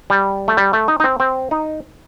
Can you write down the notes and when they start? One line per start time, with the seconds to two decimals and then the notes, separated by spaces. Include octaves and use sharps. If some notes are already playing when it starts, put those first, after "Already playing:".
0.10 G3
0.48 A3
0.57 G3
0.73 A3
0.88 D#4
1.00 D#4
1.04 C4
1.20 C4
1.51 D#4